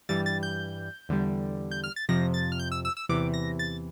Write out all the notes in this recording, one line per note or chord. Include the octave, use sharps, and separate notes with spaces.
G2 E3 G3 A6
A6
G6
E2 D3 G3
G6
F6
A6
F2 C3 F3 A#6
A6
F6
G6
E6
E6
E6
E2 C3 E3 D6
A#6
A6